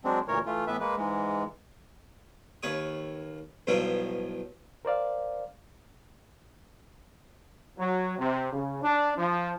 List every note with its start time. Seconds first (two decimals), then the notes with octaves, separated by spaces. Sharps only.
0.05 F#3 G#3 C4 D4
0.28 D2 A#2 E3 A#4 C#5
0.46 E3 A3 F4
0.67 A2 E3 B3 B4 E5
0.80 G#3 A#3 B4
0.97 G#2 E3 G#3
2.63 D#2 B4 C#5 D#6
3.67 E2 G2 B2 F3 F#3 B3
4.85 A#4 C5 D5 F5
7.77 F#3
8.18 C3
8.52 C#3
8.82 D4
9.17 F3